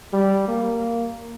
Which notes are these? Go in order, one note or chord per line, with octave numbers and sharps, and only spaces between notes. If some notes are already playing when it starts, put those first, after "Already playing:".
G3
A#3